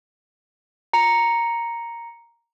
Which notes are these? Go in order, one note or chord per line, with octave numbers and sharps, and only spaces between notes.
A#5 C#7